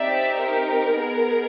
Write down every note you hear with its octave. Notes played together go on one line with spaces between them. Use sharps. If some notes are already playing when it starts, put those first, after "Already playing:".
Already playing: C4 D#4 G4 D5 E5
A#4
B3 D#4 G#4